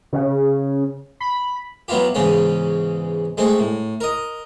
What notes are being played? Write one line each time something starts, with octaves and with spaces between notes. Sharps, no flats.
C#3
B5
F#3 B3 E4 F4 G4
E2 G#2 C#3 G#3 C#4
G#3 A3 C4
A2
A#4 D#5